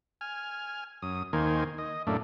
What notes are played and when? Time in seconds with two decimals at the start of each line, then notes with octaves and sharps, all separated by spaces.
0.21 G#5 F6
1.02 F#2 D#6
1.33 D#2 D#3 A#3 C5 G#5
1.78 D#5
2.07 F#2 A2 A3 A#3 D4